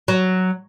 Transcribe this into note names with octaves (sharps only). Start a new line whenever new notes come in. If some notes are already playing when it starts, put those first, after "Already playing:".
F#3